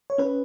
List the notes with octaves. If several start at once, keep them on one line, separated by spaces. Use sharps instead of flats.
C#5
C#4 B4